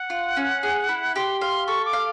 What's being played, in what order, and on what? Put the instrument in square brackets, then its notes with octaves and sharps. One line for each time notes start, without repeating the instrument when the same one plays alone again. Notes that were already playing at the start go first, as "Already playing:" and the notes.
Already playing: [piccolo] F#5
[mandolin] F4
C#4
G#4
E4
[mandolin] G4 [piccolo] C6
[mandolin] F5 [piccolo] C6
[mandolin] A4 [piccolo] C#6
[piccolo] D6
[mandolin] F5